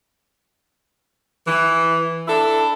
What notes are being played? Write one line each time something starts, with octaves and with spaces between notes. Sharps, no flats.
E3
D4 E4 A4